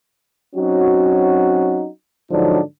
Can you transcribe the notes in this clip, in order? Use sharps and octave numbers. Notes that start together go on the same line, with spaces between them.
F#3 C4 C#4 D#4 F#4
G#2 D3 F3 F#3 D4 D#4